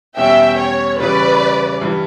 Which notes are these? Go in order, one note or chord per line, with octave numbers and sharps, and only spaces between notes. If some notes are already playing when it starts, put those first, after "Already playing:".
E2 B2 G3 C#4 E5 G5
C#5
C#3 E3 G3 C#4 B4 D5
G2 E3 G3